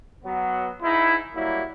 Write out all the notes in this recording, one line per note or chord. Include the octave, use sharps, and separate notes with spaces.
F#3 B3
G#2 D#4 E4
F#3 G3 A#3 E4